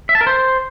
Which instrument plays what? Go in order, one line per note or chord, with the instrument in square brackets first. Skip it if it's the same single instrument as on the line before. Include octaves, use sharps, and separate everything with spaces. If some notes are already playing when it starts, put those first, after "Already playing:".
[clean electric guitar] E5
A5
A#4
C5